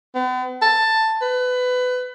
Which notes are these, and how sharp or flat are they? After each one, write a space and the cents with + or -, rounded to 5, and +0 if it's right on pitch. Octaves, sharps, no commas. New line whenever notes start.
B3 +40
A5 +10
B4 +20